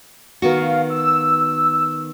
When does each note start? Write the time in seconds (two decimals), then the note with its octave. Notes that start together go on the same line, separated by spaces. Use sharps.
0.42 D#3 B3 F#4 F5
0.90 E6